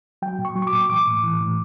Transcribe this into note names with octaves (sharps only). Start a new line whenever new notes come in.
F#3 G5
A#2
C#6
F#3
C#6
D6
A#2
E3 D6
A2
E3
A2